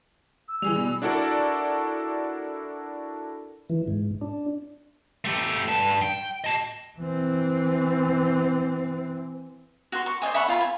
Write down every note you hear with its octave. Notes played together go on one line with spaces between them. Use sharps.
E6
E3 G3 G#4 F7
B2
D4 E4 F#4 A4 A#4 D5
E3
G#2
D4
A3 G4
G2 A5
G5
D#5 A5
E3 C4
F#4 C6
C#6
C5 D5 D#5 G#5
E5 F#5 B5 C#6
F4 G#5 B5
G#5